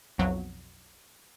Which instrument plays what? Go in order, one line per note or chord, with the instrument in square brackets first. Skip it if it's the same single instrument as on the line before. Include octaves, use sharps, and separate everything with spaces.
[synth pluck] B1 F2 F#3